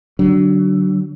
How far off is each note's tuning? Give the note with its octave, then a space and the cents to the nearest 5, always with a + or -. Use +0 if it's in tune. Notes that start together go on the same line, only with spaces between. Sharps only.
D3 +0 F#3 +25 D4 +0